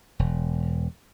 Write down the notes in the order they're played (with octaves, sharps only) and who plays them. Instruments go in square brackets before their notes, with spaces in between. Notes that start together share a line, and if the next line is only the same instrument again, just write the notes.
[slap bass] E1